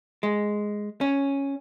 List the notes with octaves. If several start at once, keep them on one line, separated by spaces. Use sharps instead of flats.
G#3
C#4